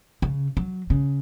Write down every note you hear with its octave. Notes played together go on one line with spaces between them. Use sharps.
C#3
F#3
C#3